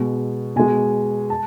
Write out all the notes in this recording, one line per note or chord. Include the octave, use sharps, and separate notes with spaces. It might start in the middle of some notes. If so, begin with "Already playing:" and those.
Already playing: B2 G#3
B2 G#3 G#5
A5